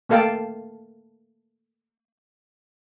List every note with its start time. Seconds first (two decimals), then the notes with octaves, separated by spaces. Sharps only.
0.09 A3 A#3 A4 F5 G5 A5